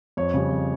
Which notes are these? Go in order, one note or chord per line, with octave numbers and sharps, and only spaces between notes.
F2 C#5
C#3 G3
F2